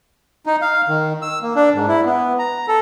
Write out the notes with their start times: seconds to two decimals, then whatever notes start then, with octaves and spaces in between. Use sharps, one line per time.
0.46 D#4
0.62 F5
0.88 D#3
1.22 E6
1.42 A#3
1.56 D4
1.74 G#2
1.88 E4
2.06 B3
2.39 A#5
2.68 A4